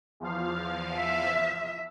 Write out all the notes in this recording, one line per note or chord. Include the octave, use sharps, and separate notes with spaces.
E2 F3 F5
E5